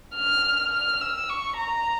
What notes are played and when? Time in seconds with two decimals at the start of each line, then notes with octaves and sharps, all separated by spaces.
0.15 F6
0.73 F6
1.01 E6
1.30 C#6
1.58 A#5